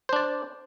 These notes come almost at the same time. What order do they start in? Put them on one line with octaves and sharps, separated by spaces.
C5 D4 D5